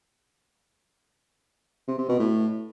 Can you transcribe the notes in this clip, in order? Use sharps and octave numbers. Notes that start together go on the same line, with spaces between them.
C3
C3
B2
A2